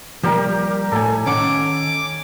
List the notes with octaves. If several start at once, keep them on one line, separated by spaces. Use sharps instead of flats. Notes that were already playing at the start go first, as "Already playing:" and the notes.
F3 G3 A#3 G4 A#4
A2 A4 G#5
D#3 C#4 F#5 D6